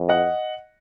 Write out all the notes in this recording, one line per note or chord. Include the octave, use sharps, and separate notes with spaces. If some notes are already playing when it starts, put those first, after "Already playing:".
Already playing: F2
D#5 F#5